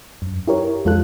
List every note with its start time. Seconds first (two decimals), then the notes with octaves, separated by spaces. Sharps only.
0.22 F#2
0.48 E4 G4 A#4 C#5
0.85 F2 G#3 F4 A4 F#6